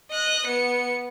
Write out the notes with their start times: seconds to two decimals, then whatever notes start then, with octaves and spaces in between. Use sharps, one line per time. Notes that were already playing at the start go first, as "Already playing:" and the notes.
0.11 D#5 F#6
0.46 B3 C#7